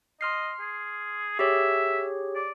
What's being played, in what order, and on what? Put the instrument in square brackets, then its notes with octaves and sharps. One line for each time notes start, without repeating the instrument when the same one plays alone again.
[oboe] D#5 [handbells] C6 F6 C7
[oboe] G#4
[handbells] G4 G#4 C#5 [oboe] E5
[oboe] D5